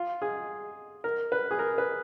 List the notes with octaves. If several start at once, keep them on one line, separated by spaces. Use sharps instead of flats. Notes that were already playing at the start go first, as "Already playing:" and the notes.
Already playing: F4
G#4
A#4
B4
G#4
A#4
B4